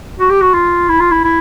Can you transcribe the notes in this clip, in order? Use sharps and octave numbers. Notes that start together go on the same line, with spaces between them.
F#4
G4
F#4
F4
E4
F4
E4
E4